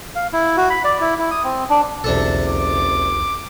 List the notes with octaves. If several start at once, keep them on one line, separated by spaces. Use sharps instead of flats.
F5
E4
F#4
B5
D5
E4
E4
D#6
C4
D4
F#1 B1 E2 C3 D4 A4
D6